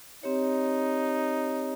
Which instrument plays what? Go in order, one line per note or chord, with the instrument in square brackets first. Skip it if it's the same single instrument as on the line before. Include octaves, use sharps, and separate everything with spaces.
[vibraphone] C4 G4 C#5 [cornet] D#4